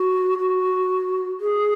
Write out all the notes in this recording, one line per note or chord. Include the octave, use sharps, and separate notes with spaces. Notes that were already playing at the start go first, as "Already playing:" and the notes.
Already playing: F#4
F#4
G#4